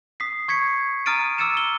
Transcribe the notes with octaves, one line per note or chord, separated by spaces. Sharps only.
D#6 B6 C7
C#6 G#6 B6 C#7
A#5 D#6 F6 A6 D7 D#7
D6 E6 F6 A6 C#7 E7
G7